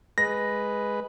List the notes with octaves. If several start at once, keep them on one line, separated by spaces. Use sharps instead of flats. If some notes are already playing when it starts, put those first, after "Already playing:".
G#3 B4 A#6